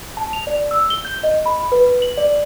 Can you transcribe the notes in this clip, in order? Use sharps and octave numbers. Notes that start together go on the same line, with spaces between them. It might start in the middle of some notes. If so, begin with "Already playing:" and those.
A5
F7
D5
E6
G7
G6
D#5
B5
B4
F#7
D5